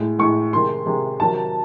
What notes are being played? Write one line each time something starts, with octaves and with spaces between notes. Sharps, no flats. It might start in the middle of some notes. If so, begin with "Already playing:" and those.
Already playing: A2 G#3
A2 G#3 C#6
C3 D#3 G#3 C6
C3 D#3 G#3
C3 D#3 F#3 A5